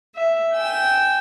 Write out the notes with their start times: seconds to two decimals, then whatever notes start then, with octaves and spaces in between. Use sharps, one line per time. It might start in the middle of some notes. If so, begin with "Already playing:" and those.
0.15 E5
0.54 G5 G#5 E6